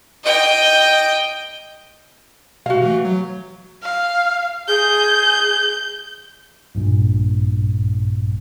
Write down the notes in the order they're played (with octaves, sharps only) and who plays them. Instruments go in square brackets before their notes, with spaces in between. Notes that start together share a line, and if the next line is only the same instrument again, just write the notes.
[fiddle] D#5 G5
[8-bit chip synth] B2 [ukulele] F#4 F5
[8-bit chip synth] E3 A3
F#3
[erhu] F5
[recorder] G#4 [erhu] G6
[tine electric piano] A#1 G2 A#2